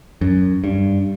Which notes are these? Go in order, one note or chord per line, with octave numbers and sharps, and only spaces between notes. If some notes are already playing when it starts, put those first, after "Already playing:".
F#2
G2